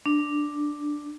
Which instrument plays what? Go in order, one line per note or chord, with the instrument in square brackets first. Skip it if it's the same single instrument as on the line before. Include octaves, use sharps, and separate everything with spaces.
[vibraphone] D4